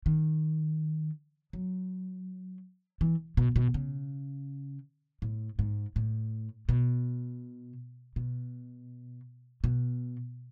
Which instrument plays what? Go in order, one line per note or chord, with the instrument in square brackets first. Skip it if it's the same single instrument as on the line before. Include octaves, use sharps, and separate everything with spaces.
[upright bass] D#3
F#3
E3
B2
B2
C#3
A2
G#2
A2
B2
B2
B2